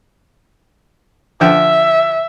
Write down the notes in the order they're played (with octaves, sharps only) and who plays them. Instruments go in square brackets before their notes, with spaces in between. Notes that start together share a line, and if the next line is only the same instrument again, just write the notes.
[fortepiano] D3 F3 G5 [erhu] E5